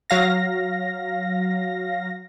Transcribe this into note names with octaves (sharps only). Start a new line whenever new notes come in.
F#3 F5 A#6